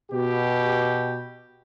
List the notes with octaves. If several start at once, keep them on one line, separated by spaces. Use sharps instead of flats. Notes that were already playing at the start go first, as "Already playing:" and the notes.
B2 G4